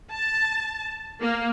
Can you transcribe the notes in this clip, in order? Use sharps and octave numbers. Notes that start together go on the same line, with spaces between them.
A5
A#3